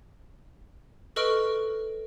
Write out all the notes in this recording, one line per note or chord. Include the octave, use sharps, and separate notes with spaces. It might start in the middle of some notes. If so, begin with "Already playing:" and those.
A4 B4 D#5 C#6 F6 D7